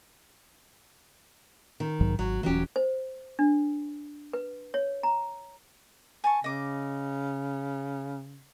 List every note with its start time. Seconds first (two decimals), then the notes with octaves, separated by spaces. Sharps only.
1.80 D#3
2.00 B1 G#2 F#3
2.19 G#1 F#3
2.43 D#1 E3 F#3 C#4 G4
2.76 C5
3.39 D4
4.33 B4
4.74 C#5
5.03 A#5
6.24 G#5 A5 C#6
6.44 C#3 D#5 D6